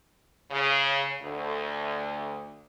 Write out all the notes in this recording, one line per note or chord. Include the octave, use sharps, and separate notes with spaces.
C#3
D2